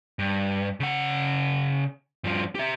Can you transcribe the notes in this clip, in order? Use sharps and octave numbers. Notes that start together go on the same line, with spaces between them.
G2
C#3 F#5
G2 F3
G4 E5